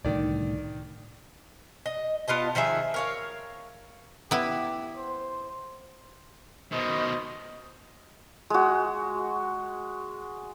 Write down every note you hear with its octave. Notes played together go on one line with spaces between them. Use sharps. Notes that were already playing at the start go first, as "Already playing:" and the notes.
C2 A2 D3 D#3 D5
D#5
B3 F4 D#5 A5
D#3 F3 G#4 E5
A#4 C#5 F5
B3 E4 G4
C5
B2 D#3 C5 D#5
G#3 F#4